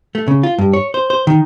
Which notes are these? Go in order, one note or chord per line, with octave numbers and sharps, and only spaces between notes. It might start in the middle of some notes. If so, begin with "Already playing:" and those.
A3
C#3
F4
G2
C#5
C5
C5
D#3